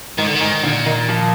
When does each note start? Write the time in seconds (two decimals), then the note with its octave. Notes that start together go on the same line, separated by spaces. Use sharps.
0.18 G#2 D#3
0.27 D3
0.35 D#3
0.41 G#2
0.63 A#2 D3
0.86 D#3
1.09 F3